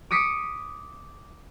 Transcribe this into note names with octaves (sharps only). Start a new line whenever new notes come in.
D6 D#6 B6 C#7